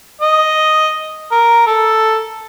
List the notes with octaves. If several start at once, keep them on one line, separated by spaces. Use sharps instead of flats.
D#5
A#4
A4